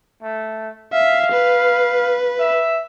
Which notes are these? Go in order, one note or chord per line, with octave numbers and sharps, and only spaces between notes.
A3
E5 F5
B4
E5